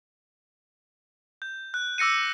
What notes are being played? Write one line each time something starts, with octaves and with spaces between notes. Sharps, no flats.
G6
F#6
D6 E6 A#6 C#7 D#7